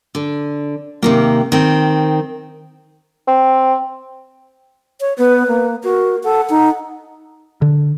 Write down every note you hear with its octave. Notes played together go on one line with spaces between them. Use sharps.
D3
C3 D#3 A#3
D#3 C4
C4
C#5
B3 B4
A#3
F#4 A#4
A4 F#5
D#4
D3